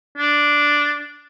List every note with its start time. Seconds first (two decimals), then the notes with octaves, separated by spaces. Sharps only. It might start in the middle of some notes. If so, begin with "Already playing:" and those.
0.17 D4